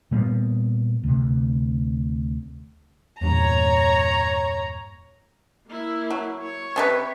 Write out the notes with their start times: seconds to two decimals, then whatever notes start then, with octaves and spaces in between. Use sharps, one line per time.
0.11 A#2 G3 A#3 B3
1.03 D2 C3
3.21 E2 G2 A#2 C#5 A#5
5.67 A#3 E4
6.10 F#3
6.43 C#5
6.76 C3 D4 B4